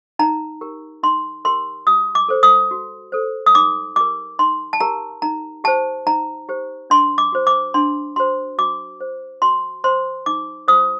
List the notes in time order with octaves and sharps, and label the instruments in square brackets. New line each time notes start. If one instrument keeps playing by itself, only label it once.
[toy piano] D#4 A#5
G4 A#4
D#4 C6
G4 A#4 C6
F#4 D#6
D6
A4 C5
D#6
F#4
A4 C5
D#6
D#4 D6
G4 A#4 D6
D#4 C6
A5
G4 A#4 A#5
D#4 A#5
G4 C5 A5
D#4 A#5
G4 C5
D4 C6
D6
F#4 C5
D6
D4 C6
F#4 C5 C6
F#4 D6
C5
F#4 C6
C5 C6
D#4 D6
F#4 C5 D#6